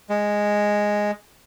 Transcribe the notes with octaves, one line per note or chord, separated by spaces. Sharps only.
G#3